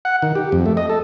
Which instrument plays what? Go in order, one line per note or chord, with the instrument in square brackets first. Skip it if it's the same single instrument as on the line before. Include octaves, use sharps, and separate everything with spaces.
[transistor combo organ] F#5
D#3
G4
F2
A3
D#5
A4